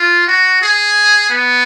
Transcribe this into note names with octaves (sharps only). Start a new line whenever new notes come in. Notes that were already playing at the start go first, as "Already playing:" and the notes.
Already playing: F4
F#4
G#4
B3